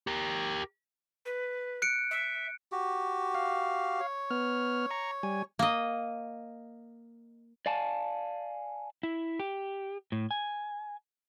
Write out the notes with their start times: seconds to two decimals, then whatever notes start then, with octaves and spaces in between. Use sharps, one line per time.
0.07 G4 A#4
1.25 B4
1.82 F#6 C#7 D7
2.11 E5
2.72 F#4 G4
3.35 F5
4.00 C#5
4.31 B3 F6
4.91 A#5 C#6
5.23 G3 G#5
5.59 A#3 D#5
7.66 D5 F5 G#5 A5
9.03 E4
9.40 G4
10.12 A2
10.31 G#5